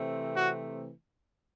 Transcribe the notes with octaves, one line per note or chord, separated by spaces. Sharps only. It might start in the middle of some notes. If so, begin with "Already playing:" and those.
Already playing: C3 E3 A3 C4
F#4